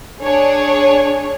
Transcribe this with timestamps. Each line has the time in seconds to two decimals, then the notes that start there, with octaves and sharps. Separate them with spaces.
0.22 D4 G#4 C#5